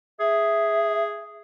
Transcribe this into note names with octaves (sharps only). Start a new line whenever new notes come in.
G#4 E5